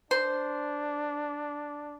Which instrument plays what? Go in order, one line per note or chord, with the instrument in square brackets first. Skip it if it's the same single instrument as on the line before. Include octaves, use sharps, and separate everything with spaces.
[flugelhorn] D4 [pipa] C5